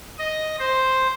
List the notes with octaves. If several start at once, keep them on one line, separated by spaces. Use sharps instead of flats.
D#5
C5